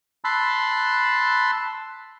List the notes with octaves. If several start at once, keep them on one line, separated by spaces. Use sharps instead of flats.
A5 B5 C6 E6 F#6